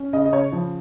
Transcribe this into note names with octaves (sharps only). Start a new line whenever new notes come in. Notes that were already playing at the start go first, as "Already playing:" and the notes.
Already playing: C#4
C#3 D#5
D#5
C#3 C#5
F3